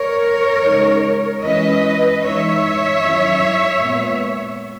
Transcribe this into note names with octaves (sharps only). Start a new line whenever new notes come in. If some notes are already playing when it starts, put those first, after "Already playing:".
Already playing: A#4 C#5
C#3 G#3 D#4
E3 G#3 C#4 E4 B4 D#5
E3 G#3 D#4 C#5 E5
D#3 F#3 C#4 E4
A#2 G#3 B3